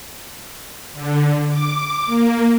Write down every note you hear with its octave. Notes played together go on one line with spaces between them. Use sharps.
D3
D6
A#3